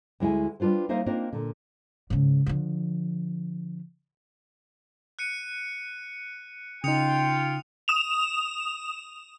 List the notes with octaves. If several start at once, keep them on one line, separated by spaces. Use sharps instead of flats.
D2 G#3 E4 E5 G#5
G3 D4 F4 B4 C5
A#3 D#4 C5 E5 F5
A#3 C4 D4 D#4 F4 C5
A#2 D3
G#2 C#3
D3 F3
F#6 C#7 D#7
C#3 D#4 F4 G5 D#6 C#7 F7
D#6 E7 F7